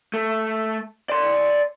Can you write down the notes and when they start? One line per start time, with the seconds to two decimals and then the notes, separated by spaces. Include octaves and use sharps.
0.14 A3
1.09 D5 C6